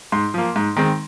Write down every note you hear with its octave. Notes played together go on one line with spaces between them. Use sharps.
G#2 C6
F3 A#3
G#2
D#3 G#3 C4